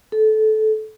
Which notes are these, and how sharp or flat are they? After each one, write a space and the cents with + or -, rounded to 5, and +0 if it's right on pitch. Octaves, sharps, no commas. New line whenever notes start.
A4 -20